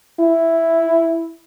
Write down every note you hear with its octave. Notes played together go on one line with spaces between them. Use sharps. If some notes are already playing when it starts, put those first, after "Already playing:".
E4